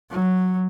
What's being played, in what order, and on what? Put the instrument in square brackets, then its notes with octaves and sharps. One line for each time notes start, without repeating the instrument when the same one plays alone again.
[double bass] F#3